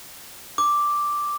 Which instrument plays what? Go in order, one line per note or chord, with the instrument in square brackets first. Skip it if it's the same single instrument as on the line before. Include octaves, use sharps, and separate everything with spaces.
[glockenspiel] D6